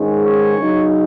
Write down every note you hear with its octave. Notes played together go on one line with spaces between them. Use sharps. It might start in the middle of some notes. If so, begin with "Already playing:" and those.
Already playing: G#2 D#3 G#3 C#4
C#5
C#3 F#3 D#4